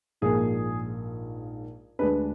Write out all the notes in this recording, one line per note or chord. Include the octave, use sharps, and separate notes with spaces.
A#1 G#2 F3 A#3 G#4
D2 D3 G#3 D4 B4